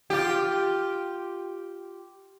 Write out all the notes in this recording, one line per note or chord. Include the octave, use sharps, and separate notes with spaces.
F4 G4